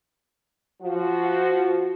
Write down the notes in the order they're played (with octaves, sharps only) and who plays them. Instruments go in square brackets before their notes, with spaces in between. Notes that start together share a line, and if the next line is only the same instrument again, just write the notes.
[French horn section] F3 F#4